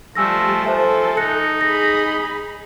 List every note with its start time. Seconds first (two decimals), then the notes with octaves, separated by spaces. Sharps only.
0.15 F3 G3 A3 G#5 E6 A#6
0.64 F3 A4 C5 E5 G#5
1.17 D#4 F#6 A#6 C#7
1.61 G#4 B5 A#6